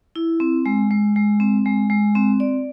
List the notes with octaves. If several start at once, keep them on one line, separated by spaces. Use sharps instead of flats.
E4
C4
G#3
G#3
G#3
C4
G#3
G#3
C4
D5